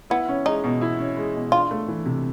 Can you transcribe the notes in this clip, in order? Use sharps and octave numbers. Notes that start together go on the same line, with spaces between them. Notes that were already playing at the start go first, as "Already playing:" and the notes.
B3 E4
C#4
G#3 D#4
B2
E4
C#4
G#3
B2
D4 F4
A3
E3
C3